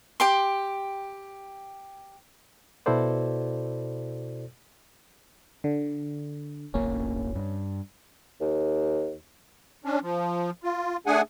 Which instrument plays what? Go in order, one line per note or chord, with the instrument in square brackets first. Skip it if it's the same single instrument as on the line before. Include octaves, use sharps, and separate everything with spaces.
[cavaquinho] G4 G5 C6
[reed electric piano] B2 E4 F#4 A4 C5 D5
[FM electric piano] D3
[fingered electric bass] D1 G1 A#3 [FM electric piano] C#4
[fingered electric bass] G2
[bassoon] D#2
[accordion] C#4 D4
F3
F4
A3 D4 G#4 F#5 G#5